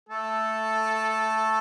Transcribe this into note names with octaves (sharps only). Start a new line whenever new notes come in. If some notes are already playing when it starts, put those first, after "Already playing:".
A3 A4